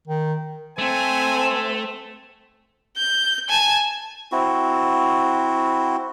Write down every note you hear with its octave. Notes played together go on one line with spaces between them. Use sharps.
D#3
A3 C4 G#5
G6
G#5 A5
C4 E4 F#4